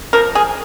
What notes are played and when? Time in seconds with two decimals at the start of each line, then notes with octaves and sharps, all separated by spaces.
0.13 F3 A#4
0.35 G#4